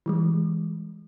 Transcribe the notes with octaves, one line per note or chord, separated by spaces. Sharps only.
E3 G3 G#3